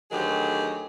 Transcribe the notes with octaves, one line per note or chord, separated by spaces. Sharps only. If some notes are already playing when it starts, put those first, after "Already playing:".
D2 D#3 F#3 G4 G#4